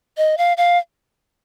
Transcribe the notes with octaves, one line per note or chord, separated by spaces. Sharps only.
D#5
F5
F5